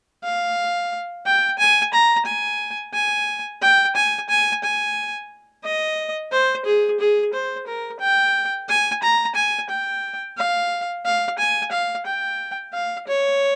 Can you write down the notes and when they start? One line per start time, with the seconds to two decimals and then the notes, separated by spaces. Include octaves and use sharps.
0.24 F5
1.26 G5
1.59 G#5
1.93 A#5
2.26 G#5
2.94 G#5
3.62 G5
3.95 G#5
4.29 G#5
4.64 G#5
5.64 D#5
6.32 C5
6.65 G#4
7.00 G#4
7.33 C5
7.67 A#4
8.00 G5
8.68 G#5
9.02 A#5
9.35 G#5
9.69 G5
10.37 F5
11.05 F5
11.39 G#5
11.72 F5
12.06 G5
12.73 F5
13.07 C#5